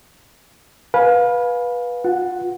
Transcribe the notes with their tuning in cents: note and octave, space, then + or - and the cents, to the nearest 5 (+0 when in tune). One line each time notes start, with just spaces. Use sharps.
B4 -15 F5 +25 G#5 +10
F4 +30 F#5 +0